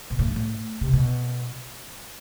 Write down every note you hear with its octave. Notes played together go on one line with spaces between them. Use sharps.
B2
A2
G2
A2
C3
B2